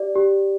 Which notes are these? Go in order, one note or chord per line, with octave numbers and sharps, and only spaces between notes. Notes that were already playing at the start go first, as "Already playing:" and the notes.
Already playing: G4 D5
G4